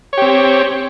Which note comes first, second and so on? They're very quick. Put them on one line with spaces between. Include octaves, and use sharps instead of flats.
C#5 G4 C4